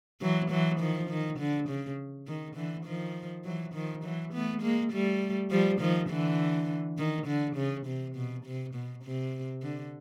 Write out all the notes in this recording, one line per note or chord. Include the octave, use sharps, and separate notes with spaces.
E3 F#3
E3 F#3
D#3 F3
D#3
D3
C#3
D#3
D3 E3
D#3 F3
E3 F#3
D#3 F3
E3 F#3
A3 B3
G#3 A#3
G3 A3
F3 G3
D#3 F3
D3 E3
D#3
D3
C#3
C3
B2
C3
B2
C3
D3